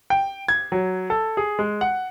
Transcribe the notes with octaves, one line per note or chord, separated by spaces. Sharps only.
G5
G#6
F#3
A4
G#4
G#3
F#5